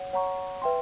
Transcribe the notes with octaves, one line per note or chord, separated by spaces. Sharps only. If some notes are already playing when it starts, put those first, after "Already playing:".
Already playing: C#5 F#5
C#5 F#5 A#5 C#6
B4 E5 G5 C6